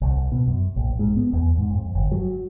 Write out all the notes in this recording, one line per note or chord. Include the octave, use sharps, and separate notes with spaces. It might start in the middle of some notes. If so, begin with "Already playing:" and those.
C2
B2
F#2
A#1
G#2
B3
E2
G#2
F2
G1
F#3